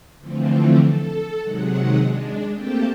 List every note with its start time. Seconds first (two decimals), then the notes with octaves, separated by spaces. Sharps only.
0.19 D3 E3 F3 A3 C4
0.79 A4
1.41 C3 D#3 F#3 G#3 F#5
1.97 G#3 D4
2.52 A3 A#3 C4 G4 G5 A5